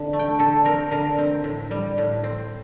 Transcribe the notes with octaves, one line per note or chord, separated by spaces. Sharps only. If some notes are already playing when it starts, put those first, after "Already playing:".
Already playing: D3 C4
A3
G5
D3 A4
C4 A#4
D3 A#4
C4
A2
G3
A2
C4